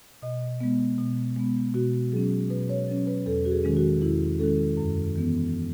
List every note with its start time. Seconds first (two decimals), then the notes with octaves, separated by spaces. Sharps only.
0.22 B2 D#5
0.61 G#3 B3
0.98 B2
1.36 G#3 B3
1.74 B2 F#4
2.12 F#3 C#4 G#4
2.50 B2 B4
2.69 C#5
2.88 F#3 C#4
3.07 B4
3.26 E2 A4
3.45 F#4
3.52 G#4
3.64 D#3 G#3 C#4
3.77 F#4
4.02 E2 E4
4.39 D#3 G#3 C#4 A4
4.77 F#2
5.16 E3 B3